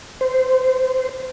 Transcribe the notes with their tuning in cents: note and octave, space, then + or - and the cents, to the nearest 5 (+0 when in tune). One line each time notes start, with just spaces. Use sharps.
C5 -15